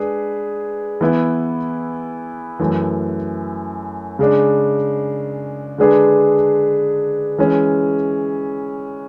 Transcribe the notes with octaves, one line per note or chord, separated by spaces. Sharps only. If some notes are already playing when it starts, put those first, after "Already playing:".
Already playing: G#3 D4 G#4 B4
E3 B3 E4
F#2 E3 A3
C#3 G#3 D4
D3 G#3 D4 G#4 B4
E3 G#3 C#4